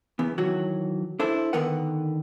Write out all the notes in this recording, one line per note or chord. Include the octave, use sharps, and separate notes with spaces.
E2 B3
D#3 E3 F#3 F#4 C#5
D4 E4 A4 C5
D3 D#3 B3 A#4 B4 F#5